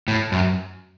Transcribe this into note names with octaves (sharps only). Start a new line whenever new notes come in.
A2
F#2